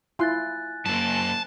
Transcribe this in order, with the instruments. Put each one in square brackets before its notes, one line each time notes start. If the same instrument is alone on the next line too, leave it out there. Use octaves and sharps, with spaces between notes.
[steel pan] E4 F4 C6 [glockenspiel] G#5 F#6 A6
[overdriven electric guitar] F#2 A#3 [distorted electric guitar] A5